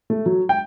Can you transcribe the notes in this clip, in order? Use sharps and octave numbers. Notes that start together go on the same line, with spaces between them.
A3
F#3
G5